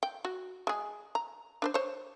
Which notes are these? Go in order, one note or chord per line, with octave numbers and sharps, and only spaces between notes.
G5
F#4
G#3 G#4
A#5
D4 B4 C5
C5 C#5